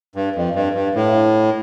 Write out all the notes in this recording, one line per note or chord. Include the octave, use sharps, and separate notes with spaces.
G2
F2
G2
G2
A2